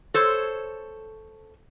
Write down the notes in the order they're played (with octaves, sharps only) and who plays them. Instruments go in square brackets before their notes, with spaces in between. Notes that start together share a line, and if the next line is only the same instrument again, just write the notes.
[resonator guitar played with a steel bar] A4 C5 C#5